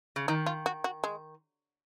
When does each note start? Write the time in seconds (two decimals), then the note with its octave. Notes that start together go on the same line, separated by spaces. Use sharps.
0.16 C#3
0.28 D#3 D#4
0.46 F4
0.66 F#4
0.84 F#4
1.04 G#3